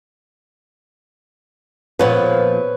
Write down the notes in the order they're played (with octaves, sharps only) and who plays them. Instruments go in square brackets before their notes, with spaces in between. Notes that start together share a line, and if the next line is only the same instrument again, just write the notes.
[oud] A#2 F3 B3 [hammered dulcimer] B4 C#5